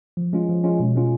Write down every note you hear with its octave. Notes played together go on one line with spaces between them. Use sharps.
F3
G#3 C#4 F4
F3
G#3 C#4 F4
B2
G#3 C#4 F4